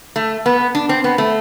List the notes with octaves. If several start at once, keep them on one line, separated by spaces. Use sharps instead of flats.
A3
B3
D4
C4
B3
A3